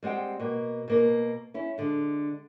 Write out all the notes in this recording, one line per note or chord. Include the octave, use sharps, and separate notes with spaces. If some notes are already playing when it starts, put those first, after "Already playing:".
G3 G#3 C4 F#5 G5
B2 A#3
B2 A#3 A#4
C#4 E4
D3 G#3